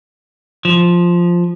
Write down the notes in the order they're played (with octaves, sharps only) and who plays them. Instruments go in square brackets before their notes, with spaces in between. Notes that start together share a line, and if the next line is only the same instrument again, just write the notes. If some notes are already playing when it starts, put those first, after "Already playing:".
[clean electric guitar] F3